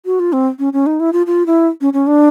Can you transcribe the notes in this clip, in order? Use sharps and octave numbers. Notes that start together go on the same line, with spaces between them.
F#4
F4
C4
C#4
C#4
D#4
E4
F4
F4
E4
C#4
C#4
D4